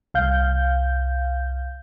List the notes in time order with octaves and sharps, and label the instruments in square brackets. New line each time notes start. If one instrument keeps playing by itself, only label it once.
[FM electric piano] C2 F5 G6